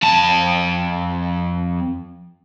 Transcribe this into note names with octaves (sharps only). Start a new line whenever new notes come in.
F2 A5